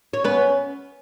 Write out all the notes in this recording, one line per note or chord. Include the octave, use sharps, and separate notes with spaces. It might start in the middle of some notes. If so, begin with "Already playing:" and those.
C#5
B3 C#4 B4